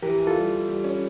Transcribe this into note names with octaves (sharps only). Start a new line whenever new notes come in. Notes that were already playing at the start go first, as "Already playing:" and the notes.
E3 G4 A#4
E3
F4 A4
G3
E3
G3
C#4